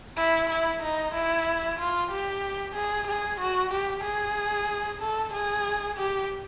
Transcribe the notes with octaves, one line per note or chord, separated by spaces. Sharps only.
E4
E4
D#4
E4
F4
G4
G#4
G#4
F#4
G4
G#4
A4
G#4
G4